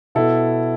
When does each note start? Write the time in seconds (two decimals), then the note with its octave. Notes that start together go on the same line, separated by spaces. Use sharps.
0.15 B2 E4 A4